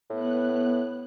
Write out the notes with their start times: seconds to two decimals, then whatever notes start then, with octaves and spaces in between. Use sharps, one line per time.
0.10 A2 B3 F#6